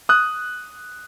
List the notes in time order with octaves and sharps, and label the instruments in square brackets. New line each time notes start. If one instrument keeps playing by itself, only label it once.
[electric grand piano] D#6 F#6